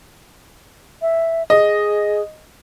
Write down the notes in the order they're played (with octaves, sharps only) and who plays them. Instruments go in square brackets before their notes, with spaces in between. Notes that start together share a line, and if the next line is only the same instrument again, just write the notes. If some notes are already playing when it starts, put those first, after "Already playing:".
[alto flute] E5
[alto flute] G#4 [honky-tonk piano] D#5